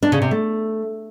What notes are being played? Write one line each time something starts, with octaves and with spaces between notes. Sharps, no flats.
D4
C#3
C3
A3